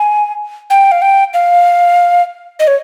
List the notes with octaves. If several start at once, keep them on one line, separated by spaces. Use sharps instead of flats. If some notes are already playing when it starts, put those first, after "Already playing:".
Already playing: G#5
G5
F5
G5
F5
D#5
C#5